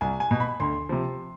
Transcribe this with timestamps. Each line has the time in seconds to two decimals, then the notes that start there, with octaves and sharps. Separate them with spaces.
0.01 C2 G#5
0.20 G#5
0.31 B2
0.40 B5
0.60 D2 C6
0.89 C3 F3